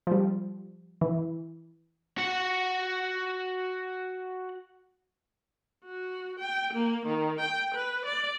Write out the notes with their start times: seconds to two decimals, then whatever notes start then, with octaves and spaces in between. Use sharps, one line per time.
0.07 F3 G3
1.01 E3
2.18 F#4 F#5
5.83 F#4
6.39 G5
6.73 A#3
7.05 D#3
7.39 G5
7.73 B4
8.05 D5